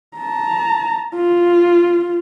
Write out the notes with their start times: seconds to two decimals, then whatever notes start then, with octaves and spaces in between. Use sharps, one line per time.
0.17 A5 A#5
1.15 F4